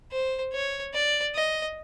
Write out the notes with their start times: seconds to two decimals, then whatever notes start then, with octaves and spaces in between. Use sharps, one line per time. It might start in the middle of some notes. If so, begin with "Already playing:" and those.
0.11 C5
0.53 C#5
0.94 D5
1.35 D#5